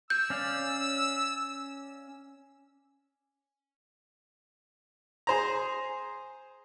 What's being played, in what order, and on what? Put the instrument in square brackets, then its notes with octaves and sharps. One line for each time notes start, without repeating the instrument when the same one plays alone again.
[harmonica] E6 [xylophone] G6
[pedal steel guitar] C#4 D5 F5
[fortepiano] G#4 C5 A#5